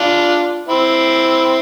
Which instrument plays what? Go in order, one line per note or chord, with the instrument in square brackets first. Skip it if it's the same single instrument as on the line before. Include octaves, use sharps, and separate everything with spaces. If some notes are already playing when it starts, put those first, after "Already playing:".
Already playing: [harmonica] D4 F4
C4 E4